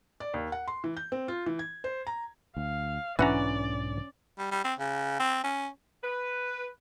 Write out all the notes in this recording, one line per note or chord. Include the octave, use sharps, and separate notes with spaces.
D5
D#2
F#5
C6
E3
G6
C4
F4
E3
G#6
C5
A#5
D2 F5
B1 G#2 E3 C#4 D4 D5 F#5 A#5
G3
G3
C4
C#3
C4
C#4
B4